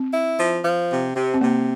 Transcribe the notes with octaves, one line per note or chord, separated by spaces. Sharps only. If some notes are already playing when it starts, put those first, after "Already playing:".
Already playing: C4
E4
F3
F3
C3
C3
C4
C3 A#3